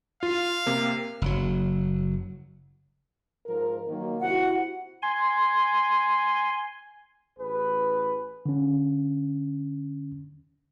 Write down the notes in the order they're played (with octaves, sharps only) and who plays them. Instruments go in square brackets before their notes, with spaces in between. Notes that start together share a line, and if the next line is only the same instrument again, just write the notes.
[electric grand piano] F4 [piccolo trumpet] F5
[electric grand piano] C3 A#3
[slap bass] F#1 F#3
[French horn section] G#2 F3 A#4
D#3 F#3 A#3
[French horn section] C3 E4 F#4 [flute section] F#5
[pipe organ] G#5 C6
[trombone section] A1 G#4 B4
[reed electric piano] D3 C#4